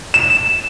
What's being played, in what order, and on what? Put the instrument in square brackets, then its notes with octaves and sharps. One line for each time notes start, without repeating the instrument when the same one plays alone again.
[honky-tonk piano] E7